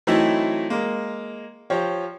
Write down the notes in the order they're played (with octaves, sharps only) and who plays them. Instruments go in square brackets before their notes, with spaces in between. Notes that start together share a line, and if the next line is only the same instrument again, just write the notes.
[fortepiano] E3 F#3 A3 C4 D#4 E4
G#3 A#3
F3 G4 C#5